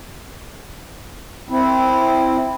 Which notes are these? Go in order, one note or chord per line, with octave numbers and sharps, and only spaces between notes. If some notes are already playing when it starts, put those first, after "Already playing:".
C4 E4